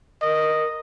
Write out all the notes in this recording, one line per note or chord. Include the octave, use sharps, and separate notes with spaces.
A#4 D#5